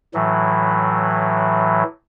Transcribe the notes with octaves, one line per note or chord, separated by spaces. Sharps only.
A2 E3 F#3